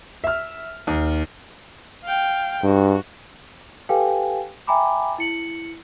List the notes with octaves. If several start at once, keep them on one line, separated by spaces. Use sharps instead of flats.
E5 F6
D#2
F5 G5
G2 F#4
G4 A4 B4 F5 G5 G#5
E5 G5 G#5 A#5 B5 D6
E4 C#7 F#7